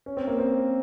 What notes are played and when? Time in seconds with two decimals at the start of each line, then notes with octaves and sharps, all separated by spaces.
0.06 C#4
0.17 C4
0.27 A#3
0.39 C4